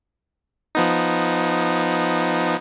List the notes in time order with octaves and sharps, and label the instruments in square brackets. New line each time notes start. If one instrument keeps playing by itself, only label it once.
[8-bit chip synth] F3 B3 D#4